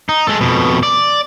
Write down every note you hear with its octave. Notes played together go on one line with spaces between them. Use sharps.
D#4
G#3 A4
F2 B2
D5